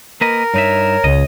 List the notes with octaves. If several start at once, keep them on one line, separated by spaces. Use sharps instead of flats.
A#3 A#4 B4 D#5
G2 D#4 C#5 E5
C#2 D#5